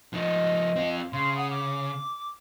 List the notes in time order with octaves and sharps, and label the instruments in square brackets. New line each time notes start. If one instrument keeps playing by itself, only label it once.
[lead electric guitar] F3 D#4 [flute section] D#5
[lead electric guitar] C4 F4
[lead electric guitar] C#3 [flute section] F5 C6
[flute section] F#5 D#6
D6